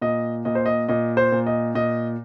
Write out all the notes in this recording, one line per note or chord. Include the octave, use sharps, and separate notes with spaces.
A#2 D#5
A#2 D#5
C5
D#5
A#2 D#5
C5
A#2
D#5
A#2 D#5